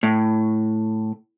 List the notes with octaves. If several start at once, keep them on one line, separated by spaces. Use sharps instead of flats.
A2